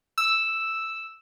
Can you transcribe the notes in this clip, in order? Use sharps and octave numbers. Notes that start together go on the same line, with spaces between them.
E6